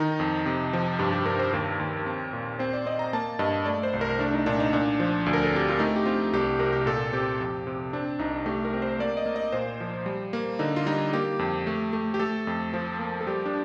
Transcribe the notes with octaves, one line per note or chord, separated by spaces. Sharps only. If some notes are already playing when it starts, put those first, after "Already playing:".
Already playing: D#3 D#4
F2
C3
F3
G2 G4
G4
G2 A#4
C5
D#2 A#4
D#2
C4
A#2
C4 C5
D5
C4 D#5
A#5
A#3 A5
G2 D#5
A3 D5
C5
C2
A#4
A3 D4
D#4
A#2 D4
D#4
A#2 D4
F3
D2
A#4
A4
C4 G4
F4
A3 D#4
G4
C4 F4
C2 G4
C3 A#4
G4
A#2 A4
C4 G4
F2
C3
C4 D4
C2 D#4
A3 G4
A#4
C4
C5
A#3 D5
D#5
A#3
D#5
A#2 C5
F3
G3
A#3
D3 D#4
F4
G3 D#4
A#3 G4
F2
A3
A3
G4
A3 A4
F2
F3
A#3
A4
G3 G4
D4